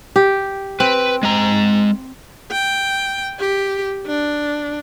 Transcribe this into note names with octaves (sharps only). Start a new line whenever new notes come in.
G4
C4 B4
G#3 A#5
G5
G4
D4